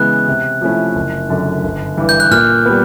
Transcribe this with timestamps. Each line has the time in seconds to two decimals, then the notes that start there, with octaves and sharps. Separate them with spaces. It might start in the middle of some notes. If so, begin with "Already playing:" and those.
Already playing: C#3 E3 G#3 B3 F#6
0.28 C3
0.61 F3 A3 C#4 E4
0.95 F#1
1.29 F#2 D3
1.63 G1
1.97 G2 E3
2.09 G6
2.20 F#6
2.31 A#2 F6
2.65 G3 B3